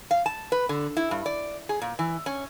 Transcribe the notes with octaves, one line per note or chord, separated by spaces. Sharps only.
F5
A5
B4
D3
E4
G2
D5
G#4
A#2
E3
C#4